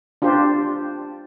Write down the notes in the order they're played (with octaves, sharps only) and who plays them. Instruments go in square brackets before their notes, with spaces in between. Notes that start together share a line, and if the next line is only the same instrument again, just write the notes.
[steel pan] D4 F4 G4 C5